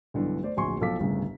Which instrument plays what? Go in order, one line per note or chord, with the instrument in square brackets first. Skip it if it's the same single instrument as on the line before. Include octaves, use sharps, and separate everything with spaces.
[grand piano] B1 G2 D3 E3
A3 C5 D5
D1 A#1 G#5 C6 C#6
B1 F3 A4 F5 D6 B6
G1 C2 A2 C#3 G3